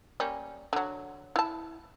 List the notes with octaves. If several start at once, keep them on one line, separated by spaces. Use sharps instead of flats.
G3 A#3 C#4
D3 F#3
E4 A5